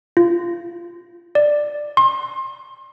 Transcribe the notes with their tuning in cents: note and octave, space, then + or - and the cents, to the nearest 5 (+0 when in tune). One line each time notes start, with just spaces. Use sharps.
F4 -20
D5 +10
C6 +30